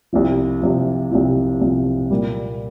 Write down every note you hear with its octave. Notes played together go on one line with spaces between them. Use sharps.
C2 C3 F3
C2 C3 F3
C2 C3 F3
C2 C3 F3
A#2 G3 A#3